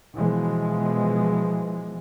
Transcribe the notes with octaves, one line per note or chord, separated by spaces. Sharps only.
B2 E3 F3 G#3